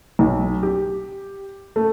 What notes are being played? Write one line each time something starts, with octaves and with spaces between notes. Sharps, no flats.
B1
G4
A3